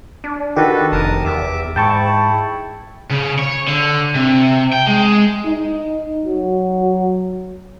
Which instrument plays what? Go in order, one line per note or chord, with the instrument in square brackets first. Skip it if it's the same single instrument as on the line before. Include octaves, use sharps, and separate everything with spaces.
[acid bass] D4
[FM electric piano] D#3 G4 [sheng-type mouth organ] F#4 A4 B4
[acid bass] F1 [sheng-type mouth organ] A#4 A5 D#6
[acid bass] E2 [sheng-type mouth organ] E5 D6
[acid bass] G#2 [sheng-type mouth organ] E4 [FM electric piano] G5 A5 C#6
[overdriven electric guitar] C#3
C#5
D3
C3
G5
G#3
[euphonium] D#4
F#3